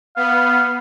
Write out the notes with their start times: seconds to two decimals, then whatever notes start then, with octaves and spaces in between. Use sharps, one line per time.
0.16 B3 F5